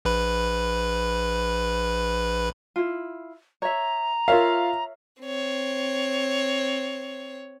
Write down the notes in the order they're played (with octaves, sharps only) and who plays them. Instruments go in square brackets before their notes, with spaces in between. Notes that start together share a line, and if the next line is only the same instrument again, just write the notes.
[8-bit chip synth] A#1 B4 B5
[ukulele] E4 F4
[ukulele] C#5 E5 [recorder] A#5
[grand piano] F4 F5 [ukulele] A#4 C#5 E5
[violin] C4 C#5